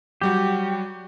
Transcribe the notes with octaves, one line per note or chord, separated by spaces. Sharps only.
F#3 G3 F#4 G4